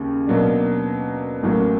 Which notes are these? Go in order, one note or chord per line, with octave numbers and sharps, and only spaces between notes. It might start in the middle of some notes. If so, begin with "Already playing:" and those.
Already playing: D#2 C#3 C#4
B2 F#3 A#3 D4
A1 A2 F#3 A#3